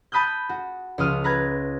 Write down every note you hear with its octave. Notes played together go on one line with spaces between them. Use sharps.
A5 B5 D#6 F#6 G6
F#4
C#2 F3 F4 D#6 F6
B4 A#5 F#6 G#6